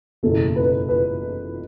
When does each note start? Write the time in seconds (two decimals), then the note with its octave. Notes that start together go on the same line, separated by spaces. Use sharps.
0.23 F#1 E2 B2 A4
0.56 B4
0.89 B4